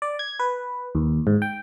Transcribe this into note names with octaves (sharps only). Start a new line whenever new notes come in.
D5
G#6
B4
D#2
G#2
G5